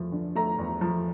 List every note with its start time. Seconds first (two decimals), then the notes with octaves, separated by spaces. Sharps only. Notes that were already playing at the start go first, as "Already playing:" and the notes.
Already playing: E2 F3 A3
0.12 D3
0.35 A3 A#5
0.58 E2
0.81 F3